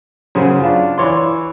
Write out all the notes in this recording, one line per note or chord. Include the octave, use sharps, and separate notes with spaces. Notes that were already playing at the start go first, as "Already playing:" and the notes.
F#2 C#3 G#4 C5
D4 F4
E3 C#5 D5 C6